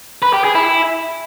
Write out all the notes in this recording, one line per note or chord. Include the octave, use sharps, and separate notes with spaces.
B4
G4
G#4
E4